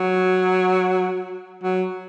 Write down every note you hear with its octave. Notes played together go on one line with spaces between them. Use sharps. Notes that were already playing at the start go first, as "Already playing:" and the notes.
Already playing: F#3
F#3